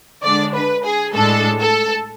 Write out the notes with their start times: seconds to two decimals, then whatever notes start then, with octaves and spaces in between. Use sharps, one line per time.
0.23 D3 G#3 D4 D5
0.55 B4
0.85 G#4
1.14 A2 G#3 D4 A4
1.60 A4